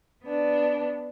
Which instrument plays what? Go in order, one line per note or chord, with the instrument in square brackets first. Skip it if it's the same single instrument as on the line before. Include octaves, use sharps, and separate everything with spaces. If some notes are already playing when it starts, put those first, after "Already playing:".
[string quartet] B3 D4